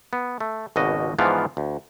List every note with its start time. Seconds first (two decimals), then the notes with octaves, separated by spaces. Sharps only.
0.13 B3
0.40 A3
0.76 G#1 C#2 B2 F#4 D#5
1.19 G#2 E3 F3 B3 D5 F5
1.57 D2